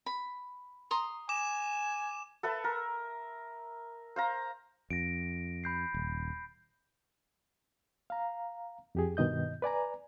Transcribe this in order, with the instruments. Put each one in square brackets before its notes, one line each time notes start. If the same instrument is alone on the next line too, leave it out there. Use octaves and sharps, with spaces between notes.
[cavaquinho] B5
A#5 C6 D#6
[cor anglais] G#5 [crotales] D6 E7
[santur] A4 B4 E5 A5
A#4
C5 F5 A#5
[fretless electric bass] F2 [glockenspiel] A#6 D7
[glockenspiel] B5 G6 C7
[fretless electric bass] D#1
[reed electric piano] F5 A#5
F2 G4 G#4
G2 B2 D#3 D#5 G6
B4 D5 G#5 A#5